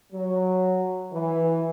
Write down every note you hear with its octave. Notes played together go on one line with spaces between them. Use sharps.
F#3
E3